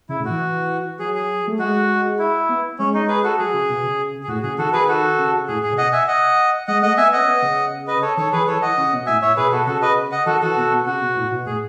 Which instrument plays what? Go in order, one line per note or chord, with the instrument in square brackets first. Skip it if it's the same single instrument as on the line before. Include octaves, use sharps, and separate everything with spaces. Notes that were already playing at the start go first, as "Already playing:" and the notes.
[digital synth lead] C#3 [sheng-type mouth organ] E4
[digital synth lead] A2
[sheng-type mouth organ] F#4
[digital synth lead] E3
[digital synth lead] F#3 [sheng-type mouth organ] G#4
[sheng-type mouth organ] G#4
[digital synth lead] A3
[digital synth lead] G#3 [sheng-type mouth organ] F#4
[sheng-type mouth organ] E4
[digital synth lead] B3
[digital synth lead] G#3 [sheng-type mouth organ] C#4
[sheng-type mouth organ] D#4
G#4 B4
F#4 A4
[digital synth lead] F#3 [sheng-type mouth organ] G#4
[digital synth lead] C#3
B2
C#3
[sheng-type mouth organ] G#4
[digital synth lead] A2 [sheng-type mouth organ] F#4
[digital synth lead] C#3 [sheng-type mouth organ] G#4
[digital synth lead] D#3 [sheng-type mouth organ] F#4 A4
[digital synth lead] D#3 [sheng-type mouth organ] G#4 B4
[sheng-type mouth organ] F#4 A4
[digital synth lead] C#3
[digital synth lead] A2 [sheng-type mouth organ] G#4
[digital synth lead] A2 [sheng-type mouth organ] G#4
[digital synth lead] C#3
[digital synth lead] B2 [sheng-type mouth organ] D#5 F#5
[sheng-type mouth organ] E5 G#5
D#5 F#5
[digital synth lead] G#3 [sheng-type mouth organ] D#5 F#5
[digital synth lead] A3 [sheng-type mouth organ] D#5 F#5
[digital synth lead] B3 [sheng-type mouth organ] E5 G#5
[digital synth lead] B3
[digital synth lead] C#4 [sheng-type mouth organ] D#5 F#5
[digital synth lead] B3
C#3
[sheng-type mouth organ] B4 D#5
A4 C#5
[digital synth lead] D#3 [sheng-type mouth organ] A4 C#5
[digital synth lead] E3 [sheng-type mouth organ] G#4 B4
[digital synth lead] E3 [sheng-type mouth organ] A4 C#5
[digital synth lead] E3 [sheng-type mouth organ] D#5 F#5
[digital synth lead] C#3
B2
[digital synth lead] A2 [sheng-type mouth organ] E5 G#5
[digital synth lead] A2 [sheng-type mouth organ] C#5 E5
[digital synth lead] B2 [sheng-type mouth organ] G#4 B4
[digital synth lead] B2 [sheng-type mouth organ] F#4 A4
[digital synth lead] C#3 [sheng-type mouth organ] F#4 A4
[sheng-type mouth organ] B4 D#5
D#5 F#5
[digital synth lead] D#3 [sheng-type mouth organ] F#4 A4
[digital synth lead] E3 [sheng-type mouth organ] F#4 A4
[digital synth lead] B2
B2
[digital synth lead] C#3 [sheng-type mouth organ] F#4
[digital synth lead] B2
A2
B2
[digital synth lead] A2 [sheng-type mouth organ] G#4